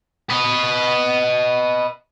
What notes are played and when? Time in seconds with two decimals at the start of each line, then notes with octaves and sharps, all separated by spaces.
0.30 B4 D#5